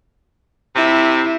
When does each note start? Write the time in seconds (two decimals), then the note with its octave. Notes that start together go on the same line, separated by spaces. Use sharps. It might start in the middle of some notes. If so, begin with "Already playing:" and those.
0.75 C3 E4